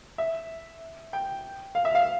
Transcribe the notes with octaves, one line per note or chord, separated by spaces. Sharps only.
E5
G5
F5
E5
F5